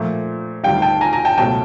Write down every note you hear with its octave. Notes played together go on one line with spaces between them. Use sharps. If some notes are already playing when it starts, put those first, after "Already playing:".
Already playing: A#2 F3 A3
D2 C3 D#3 G3 F5 G5
G5 A5
G#5 A#5
G#5 A#5
G5 A5
C#2 B2 F#3 A3 G5 A5